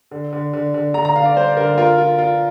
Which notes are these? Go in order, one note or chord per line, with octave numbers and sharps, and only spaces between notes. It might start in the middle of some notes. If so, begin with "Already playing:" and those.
D3
D3
D3
D3
D3 A#5
A#5
D3 F5
D5
G3 C5
D3 A#4
F4 A#4
F4
F4